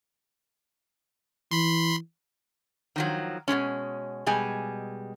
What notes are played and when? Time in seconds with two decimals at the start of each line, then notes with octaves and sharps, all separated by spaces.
1.51 E3 B5 C6
2.96 D#3 F3 F#3
3.48 B2 D3 G#3 C#4
4.26 B2 G3 G#3 G#5